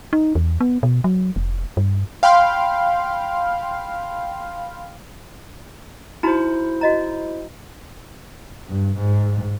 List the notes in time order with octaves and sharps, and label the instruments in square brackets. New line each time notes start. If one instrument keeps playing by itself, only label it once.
[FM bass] D#4
E2
B3
B2
F#3
F1
G2
[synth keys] F5 G5 B5 C6 F6
[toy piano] D#4 F#4 A#5 [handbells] E4 C5
[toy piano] F#4 D#5 A#5
[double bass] G2
G#2